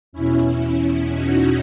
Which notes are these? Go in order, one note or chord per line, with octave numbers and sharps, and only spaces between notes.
E2 B2 C#4 E4
D#4 F#4